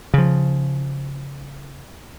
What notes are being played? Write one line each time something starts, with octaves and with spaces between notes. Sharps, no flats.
C#3 F3